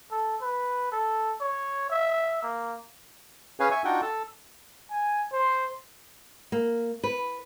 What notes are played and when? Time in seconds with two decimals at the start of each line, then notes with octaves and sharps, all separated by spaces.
0.12 A4
0.42 B4
0.92 A4
1.41 C#5
1.90 E5
2.43 A#3
3.60 C#4 G#4 B4 C#5 F5 G#5
3.71 E5 G#5 C#6
3.85 D4 D#4 F4 F#4 F#5 G5
4.02 A4 A5
4.91 G#5
5.33 C5
6.52 A#3
7.04 B4